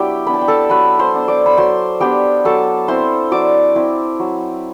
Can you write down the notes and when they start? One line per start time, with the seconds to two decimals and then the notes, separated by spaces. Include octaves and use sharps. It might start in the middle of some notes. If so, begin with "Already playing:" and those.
Already playing: F#3 B3 D4 E4 G4 G5 A5
0.26 B3 D4 B5
0.34 A5
0.41 G5
0.48 A4 A5
0.70 F#3 B4 B5
0.99 C5 C6
1.14 B3 D4
1.28 D5 D6
1.46 B5
1.57 F#3 C5 C6
2.00 B3 D4 G4 G5
2.45 F#3 A4 A5
2.88 C4 E4 C5 C6
3.31 F#3 D5 D6
3.75 C4 E4
4.19 F#3